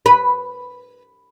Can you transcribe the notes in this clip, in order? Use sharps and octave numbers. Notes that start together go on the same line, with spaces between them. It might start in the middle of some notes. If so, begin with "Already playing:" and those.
B4